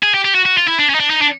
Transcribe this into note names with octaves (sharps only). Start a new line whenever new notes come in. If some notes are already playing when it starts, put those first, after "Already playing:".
G#4
G4
G4
F#4
F#4
F4
E4
D4
C#4
D#4
D4
D#4
D4